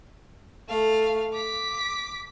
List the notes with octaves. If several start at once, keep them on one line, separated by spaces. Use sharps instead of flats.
A3 F5
D6 B6